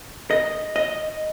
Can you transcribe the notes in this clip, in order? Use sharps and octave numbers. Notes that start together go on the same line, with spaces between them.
D#5
D#5